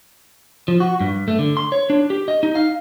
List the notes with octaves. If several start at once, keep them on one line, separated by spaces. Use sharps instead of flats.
F3
F#4
G2
A3
D3
C6
C#5
D4
G4
D#5
D#4
F5